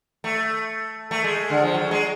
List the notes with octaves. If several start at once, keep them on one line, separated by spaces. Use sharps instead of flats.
A3
A3
G#3
D3
F3
F#3
G#3